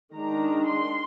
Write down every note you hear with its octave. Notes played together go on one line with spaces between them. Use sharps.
D#3 G#3 D4 A#5
C6